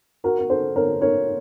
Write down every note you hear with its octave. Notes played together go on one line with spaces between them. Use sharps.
F#4 A#4
A#4
A4 C5
A#4 C#5
A#4 C#5